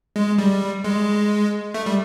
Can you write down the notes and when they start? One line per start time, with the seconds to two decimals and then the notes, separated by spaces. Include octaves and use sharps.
0.16 G#3
0.38 G3
0.84 G#3
1.74 A3
1.86 G3